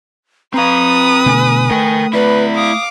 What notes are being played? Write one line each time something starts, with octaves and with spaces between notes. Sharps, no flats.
C4 B4 F5 A#5 D#6
B2 D3 A3 G#5
A3 A#4 G5
E4 B4 D5 B5
F5 D6 D#6